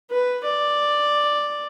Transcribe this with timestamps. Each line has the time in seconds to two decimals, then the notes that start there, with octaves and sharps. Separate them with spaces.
0.11 B4
0.44 D5